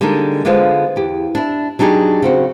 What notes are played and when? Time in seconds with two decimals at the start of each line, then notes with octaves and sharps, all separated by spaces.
0.01 D3 G3 G#3 A#3 D4 D#4
0.45 D3 G#3 B3 F4 C5 F5
0.96 E2 G4
1.35 D4 E4
1.79 F#3 D4 D#4 G4 G#4
2.22 C#3 C4 F#4